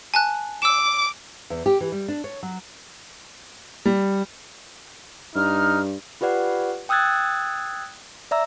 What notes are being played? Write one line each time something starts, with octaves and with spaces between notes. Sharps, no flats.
G#5 A5 F#6
D6 E6 E7
E2
G4
E3
G3
D4
C#5
F#3
G3
G2 D#4 F6
F4 G4 B4 D5 F#5
G5 D#6 E6 F#6 G#6 A6
D5 E5 A#5 E6